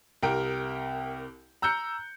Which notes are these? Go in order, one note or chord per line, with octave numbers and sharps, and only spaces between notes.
C2 G4 A#4 G5 D7
A#5 E6 F#6 G6 C#7